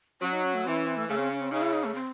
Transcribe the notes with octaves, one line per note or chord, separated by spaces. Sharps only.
F#3 C#4
D#4
C#4
A3
E3 C4
C#4
C4
A3
C#3 A3
C4
C#4
C4
C#3 D#4
E4
D#4
A3
C4